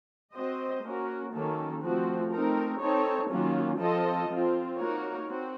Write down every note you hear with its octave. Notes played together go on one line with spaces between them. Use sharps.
C4 F#4 C5 D#5
A#3 C#4 F#4 A#4
D#3 F#3 A#3 C#4 A4
F3 A3 C4 F#4
A3 C4 D#4 A#4
C4 D#4 A4 C#5
D#3 F#3 A#3 C#4 F4
F3 C4 F4 A4 D#5
F3 C4 F4
A#3 D#4 F#4 A#4 C#5
C4 F#4